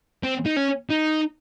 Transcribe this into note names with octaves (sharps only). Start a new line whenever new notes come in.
C4
D#4
C#4
D#4